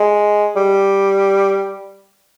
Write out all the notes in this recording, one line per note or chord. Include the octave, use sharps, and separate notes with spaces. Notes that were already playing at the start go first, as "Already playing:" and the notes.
Already playing: G#3
G3